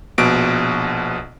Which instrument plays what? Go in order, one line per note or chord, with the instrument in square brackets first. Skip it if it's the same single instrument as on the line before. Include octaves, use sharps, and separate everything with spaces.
[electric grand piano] A#1 B2 D7